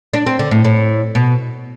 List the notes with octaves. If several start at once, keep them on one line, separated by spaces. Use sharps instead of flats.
D4
C4
D3
A2
A2
B2